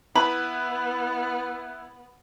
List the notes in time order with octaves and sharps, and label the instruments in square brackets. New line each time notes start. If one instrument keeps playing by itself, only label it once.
[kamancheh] B3 [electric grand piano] E4 B4 [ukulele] B5